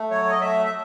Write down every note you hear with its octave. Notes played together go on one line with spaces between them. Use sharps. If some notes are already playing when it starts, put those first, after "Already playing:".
Already playing: A3
F#3 C#5
D#5
A3 E5
E5